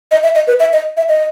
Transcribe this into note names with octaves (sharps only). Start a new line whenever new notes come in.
D#5
E5
D#5
B4
E5
D#5
E5
D#5